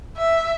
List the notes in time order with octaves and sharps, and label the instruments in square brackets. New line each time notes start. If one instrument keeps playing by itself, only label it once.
[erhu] E5